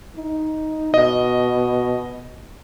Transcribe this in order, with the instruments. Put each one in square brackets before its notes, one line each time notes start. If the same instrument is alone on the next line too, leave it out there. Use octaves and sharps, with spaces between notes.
[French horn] D#4
[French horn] B2 [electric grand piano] D#5